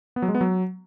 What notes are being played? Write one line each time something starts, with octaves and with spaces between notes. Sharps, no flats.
B3
F#3
G#3
B3
F#3